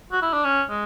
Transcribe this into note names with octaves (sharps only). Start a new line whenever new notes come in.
F#4
E4
D4
C#4
G#3